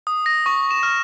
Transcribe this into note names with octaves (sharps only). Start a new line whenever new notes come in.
D#6
A#6
C#6
E7
F6